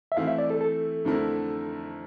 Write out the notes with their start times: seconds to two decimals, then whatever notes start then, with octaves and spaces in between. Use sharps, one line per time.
0.12 E5
0.17 E3 A3 C4 E4 F5
0.27 E5
0.38 D5
0.50 A4
0.61 A4
1.05 F2 D3 A3 E4 A#4